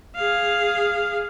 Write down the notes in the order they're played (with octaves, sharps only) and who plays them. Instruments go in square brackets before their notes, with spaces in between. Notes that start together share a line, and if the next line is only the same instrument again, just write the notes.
[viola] G#4 F5